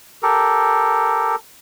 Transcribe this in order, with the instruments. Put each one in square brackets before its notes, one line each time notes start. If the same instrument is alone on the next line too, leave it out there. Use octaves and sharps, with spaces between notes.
[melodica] G4 A4 A#4